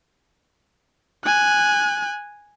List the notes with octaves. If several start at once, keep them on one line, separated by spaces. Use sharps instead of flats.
G#5 F#6